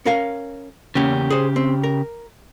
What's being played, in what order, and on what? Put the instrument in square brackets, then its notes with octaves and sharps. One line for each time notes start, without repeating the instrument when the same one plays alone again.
[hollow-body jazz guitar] C#4 A#4 F5
[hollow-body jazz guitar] E2 A#3 C#4 [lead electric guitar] C#3 G4
[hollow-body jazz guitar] G#4 C5
C4
A#4